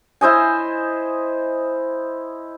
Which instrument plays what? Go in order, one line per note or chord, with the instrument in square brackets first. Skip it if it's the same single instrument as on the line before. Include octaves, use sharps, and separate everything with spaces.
[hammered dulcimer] E4 C5 D#5 G#5